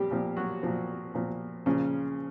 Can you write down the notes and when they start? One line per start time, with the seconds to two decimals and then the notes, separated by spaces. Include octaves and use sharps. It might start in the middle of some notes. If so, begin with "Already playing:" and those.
Already playing: A#2 F3 G3 C4 G4
0.11 A#2 F3
0.37 F#3 F#4
0.63 A#2 F3
1.14 A#2 F3
1.66 A#2 C#3 F3 C#4